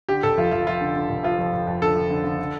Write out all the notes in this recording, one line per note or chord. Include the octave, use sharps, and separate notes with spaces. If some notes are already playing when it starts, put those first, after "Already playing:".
D3 G4
F1 A4
F2 F4
F2 F4
F2 F4
D3
D3
F1
F3 F4
F2
F2
F2
D3 A4
F3
D3
D3
D3